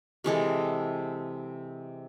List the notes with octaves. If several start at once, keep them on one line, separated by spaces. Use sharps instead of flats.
C3 E3 G#3 A4